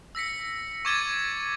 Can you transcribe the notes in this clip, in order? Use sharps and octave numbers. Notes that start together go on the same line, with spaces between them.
E6 A#6 B6 C#7
C#6 D6 G#6 A6 D#7 G7